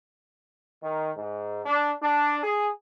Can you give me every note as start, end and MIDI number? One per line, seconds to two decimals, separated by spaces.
0.82 1.11 51
1.17 1.61 44
1.66 1.92 62
2.02 2.39 62
2.43 2.67 68